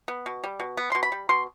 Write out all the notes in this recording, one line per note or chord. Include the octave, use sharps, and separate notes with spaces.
B3
B2
G3
B2
B3
B2 C6
B5
G3
B2 C6